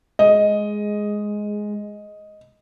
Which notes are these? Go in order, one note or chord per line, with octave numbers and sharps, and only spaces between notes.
G#3 D#5